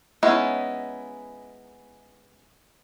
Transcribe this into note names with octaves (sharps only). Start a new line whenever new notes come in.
G#3 B3 C#4 D#4 E4